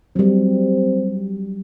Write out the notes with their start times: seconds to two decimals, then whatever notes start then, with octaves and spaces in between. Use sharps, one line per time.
0.16 F#3 G3 C4